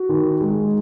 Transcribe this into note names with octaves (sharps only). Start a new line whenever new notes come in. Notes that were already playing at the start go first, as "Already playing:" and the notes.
Already playing: F#4
D#3
G#3